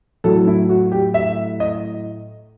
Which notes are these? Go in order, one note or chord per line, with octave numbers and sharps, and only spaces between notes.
A2 F#3 A3 A4
E4
F#4
G4
E5
D#5